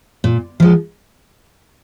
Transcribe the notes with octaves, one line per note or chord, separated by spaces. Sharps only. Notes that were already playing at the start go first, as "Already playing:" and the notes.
A#2
F3 G#3